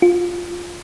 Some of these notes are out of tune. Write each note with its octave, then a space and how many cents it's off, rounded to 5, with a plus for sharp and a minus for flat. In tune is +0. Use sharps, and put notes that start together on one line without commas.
F4 +10